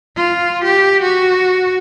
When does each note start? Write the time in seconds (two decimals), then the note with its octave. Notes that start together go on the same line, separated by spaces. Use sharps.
0.16 F4
0.64 G4
1.02 F#4